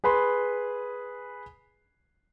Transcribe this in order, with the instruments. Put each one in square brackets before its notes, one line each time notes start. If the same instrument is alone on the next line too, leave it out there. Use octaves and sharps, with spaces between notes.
[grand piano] G#4 B4 B5 C6